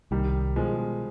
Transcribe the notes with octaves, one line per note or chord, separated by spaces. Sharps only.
C2 D#3 G3
B2 F3 G#3